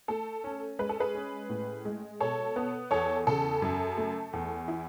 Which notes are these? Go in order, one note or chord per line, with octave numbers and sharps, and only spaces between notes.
A3 A4
C#4
G#3 B4
A4
G#4 B4
C#4
A2
G#3
B2 A4 C#5
B3
E2 A4 C#5
C#3 A4
F#2
A3
E2
E4